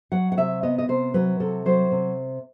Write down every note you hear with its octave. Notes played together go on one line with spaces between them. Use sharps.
F#3 F#5
F#5
C3 E5
B3 D#5
D#5
C3 C5
F#3 B4
C3 A4
F#3 C5
C3